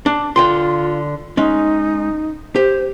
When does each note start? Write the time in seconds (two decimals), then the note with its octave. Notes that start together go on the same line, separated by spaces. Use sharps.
0.06 D4 D6
0.36 D3 F4 G5 C6
1.37 G#3 C#4 D#4
2.56 G4 C5